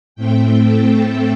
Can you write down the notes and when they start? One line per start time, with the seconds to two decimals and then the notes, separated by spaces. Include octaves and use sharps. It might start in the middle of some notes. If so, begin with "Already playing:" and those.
0.15 A2 A3 C4 G5
0.58 A4
1.02 A4